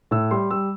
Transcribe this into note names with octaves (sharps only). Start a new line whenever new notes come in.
A2 E6
G3 C6
G3 E6